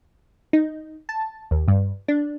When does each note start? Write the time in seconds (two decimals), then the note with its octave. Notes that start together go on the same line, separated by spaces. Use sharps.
0.53 D#4
1.09 A5
1.51 D#2
1.68 G2
2.08 D4